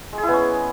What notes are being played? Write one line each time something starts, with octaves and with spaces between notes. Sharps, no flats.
G#3
G#4
E4
B3
C#4